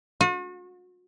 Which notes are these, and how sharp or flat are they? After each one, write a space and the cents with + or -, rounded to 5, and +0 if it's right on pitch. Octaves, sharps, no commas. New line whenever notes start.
F#4 -45